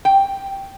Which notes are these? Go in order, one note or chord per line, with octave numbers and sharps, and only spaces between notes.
G5